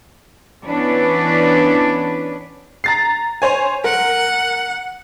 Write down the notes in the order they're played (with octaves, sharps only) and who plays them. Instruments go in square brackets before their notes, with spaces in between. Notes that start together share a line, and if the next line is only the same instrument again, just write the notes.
[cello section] E3 B3 C#4 D4 B4 D5
[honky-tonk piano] A#5 A6 C7
C5 C#5 G#5
[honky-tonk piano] A#4 [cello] F#5